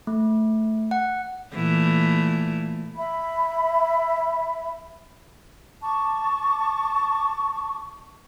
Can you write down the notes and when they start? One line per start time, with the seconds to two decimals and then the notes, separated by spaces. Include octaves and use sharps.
0.07 A3
0.91 F#5
1.54 A#2 E3 A3
2.96 E5 B5
5.82 A5 C#6 D6